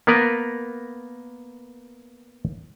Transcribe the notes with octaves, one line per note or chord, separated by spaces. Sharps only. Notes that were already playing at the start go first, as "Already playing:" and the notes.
A#3 B3 A#4 B4